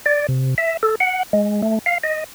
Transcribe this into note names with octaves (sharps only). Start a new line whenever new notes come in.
D5
C3
E5
A4
F#5
G#3
A3
F5
D#5